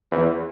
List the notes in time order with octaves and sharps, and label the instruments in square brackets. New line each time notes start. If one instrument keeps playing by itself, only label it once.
[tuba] E2